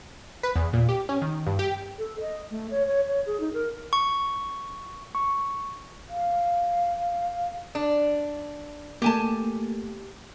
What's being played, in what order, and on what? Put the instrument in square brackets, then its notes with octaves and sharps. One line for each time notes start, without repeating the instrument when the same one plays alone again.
[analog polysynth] B4
E2
A#2
G4
C#4
D#3
G2
G4
[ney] A4
D#5
A3
C#5
C#5
C#5
G#4
D#4
A#4
[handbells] C#6
C#6
[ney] F5
[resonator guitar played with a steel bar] D4
[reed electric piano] A3 A#3 [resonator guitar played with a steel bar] G4 G#5 A5